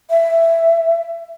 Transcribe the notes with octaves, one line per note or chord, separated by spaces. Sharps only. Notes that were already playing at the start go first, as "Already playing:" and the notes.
E5